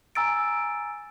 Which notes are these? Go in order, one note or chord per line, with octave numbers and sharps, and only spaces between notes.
G#5 A#5 E6 A6 D7